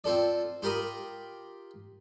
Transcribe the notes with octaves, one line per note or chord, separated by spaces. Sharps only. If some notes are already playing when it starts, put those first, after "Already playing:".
C4 F4 A4 D5
F4 G4 A#4 B5 D#6